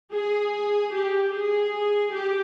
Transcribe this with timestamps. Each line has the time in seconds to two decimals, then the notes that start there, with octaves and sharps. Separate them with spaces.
0.13 G#4
0.94 G4
1.34 G#4
2.13 G4